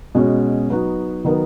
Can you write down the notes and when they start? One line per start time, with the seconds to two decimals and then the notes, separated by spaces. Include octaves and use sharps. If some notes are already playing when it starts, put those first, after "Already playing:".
0.15 B2 G#3 C#4 F#4 C#5
0.70 F#3 B3 D#4 F#4
1.25 D#3 F#3 B3 D#4 A#4